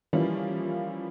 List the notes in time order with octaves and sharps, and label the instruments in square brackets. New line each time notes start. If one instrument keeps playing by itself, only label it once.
[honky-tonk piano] E3 F3 G3 A#3 C#4 F4